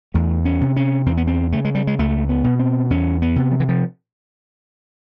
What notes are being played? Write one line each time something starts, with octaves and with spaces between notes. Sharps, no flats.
E2 A3
C#4
C3
C#4
E2 C4
B3
C4
C#3 A3
G#3
G3
G#3
C#2 A3
B3
B2
C4
E2 C#4
B3
C3
F3
E3
F3